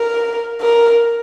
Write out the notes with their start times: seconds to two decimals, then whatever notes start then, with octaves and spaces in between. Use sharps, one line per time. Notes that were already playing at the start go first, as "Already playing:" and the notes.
Already playing: A#4
0.61 A#4